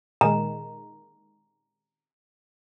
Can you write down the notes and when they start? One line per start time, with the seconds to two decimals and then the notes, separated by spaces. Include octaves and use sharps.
0.21 A#2 D#3 G#3 A#5